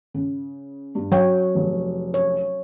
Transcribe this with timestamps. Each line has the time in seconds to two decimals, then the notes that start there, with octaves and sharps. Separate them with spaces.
0.14 C#3
0.95 G2
1.12 F#3 C#5 G5
1.55 F1
2.14 C#5